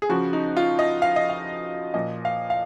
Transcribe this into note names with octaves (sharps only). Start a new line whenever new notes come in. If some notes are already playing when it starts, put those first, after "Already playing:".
G#4
C#3 F3 F#4
D#4
F4
D#5
F5
D#5
F5
A#2 F3 D#5
F5
F5